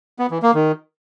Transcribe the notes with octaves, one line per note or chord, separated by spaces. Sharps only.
B3
E3
A#3
D#3